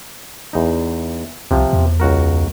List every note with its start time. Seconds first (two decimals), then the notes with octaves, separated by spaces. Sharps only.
0.53 E2 D#4
1.51 C2 C3 F3
1.73 E2
2.00 C#2 F#4 A#4